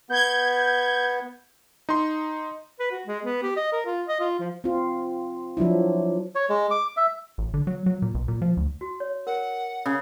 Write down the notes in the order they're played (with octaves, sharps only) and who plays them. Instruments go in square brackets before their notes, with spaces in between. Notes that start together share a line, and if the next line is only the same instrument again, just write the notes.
[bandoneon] B3 [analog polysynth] G6 G#6
[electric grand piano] D#4 C6
[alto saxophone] B4
F#4
G#3
B3
G4
D#5
A#4
F4
D#5
F4
F3
[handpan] C4 F4
F3 F#3 D4 E4
[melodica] C#5
G#3
D6
E5
[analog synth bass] A1
D3
F#3
F#3
A#2
B1
A#2
F3
D2
[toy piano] F#4
C#5
[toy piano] A#4 [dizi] F#5
[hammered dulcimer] C#3